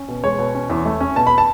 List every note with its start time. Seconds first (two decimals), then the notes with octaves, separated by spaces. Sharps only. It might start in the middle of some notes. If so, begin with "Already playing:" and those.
Already playing: C#4
0.08 B2
0.24 G#3 C#5
0.39 B2
0.55 C#4
0.70 E2
0.86 A3
1.01 C#4
1.16 B2 A5
1.27 B5
1.38 A5